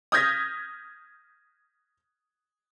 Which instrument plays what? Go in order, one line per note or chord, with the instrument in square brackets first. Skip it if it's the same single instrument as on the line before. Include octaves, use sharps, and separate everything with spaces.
[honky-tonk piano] D#6 F6 G6 G#6 A#6 B6